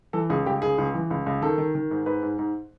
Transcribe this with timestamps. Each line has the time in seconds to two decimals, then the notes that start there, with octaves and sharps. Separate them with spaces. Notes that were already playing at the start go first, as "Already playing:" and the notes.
0.13 E3 A4
0.30 C#2 G#4
0.46 C#2 G4
0.62 C#2 G#4
0.78 C#2
0.95 E3
1.10 C#2
1.26 C#2
1.42 D#3 A4
1.58 D#3
1.75 D#3
1.91 G#2
2.06 G#2 B4
2.23 G#2
2.39 G#2